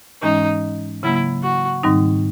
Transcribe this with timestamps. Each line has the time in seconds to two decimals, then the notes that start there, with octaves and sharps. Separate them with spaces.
0.22 G#2 E3 G#3 C#4 D#4
1.03 C#3 F#3 A#3 E4
1.43 F#4
1.83 G#2 D#3 G3 C4 D#4